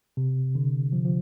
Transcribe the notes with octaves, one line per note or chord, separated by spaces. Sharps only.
C3
D3
F3
F3